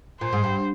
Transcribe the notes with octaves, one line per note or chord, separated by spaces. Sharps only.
A#2 C5
G#2
G2